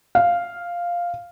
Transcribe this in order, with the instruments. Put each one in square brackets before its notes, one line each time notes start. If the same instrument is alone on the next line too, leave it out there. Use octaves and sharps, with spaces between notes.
[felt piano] F5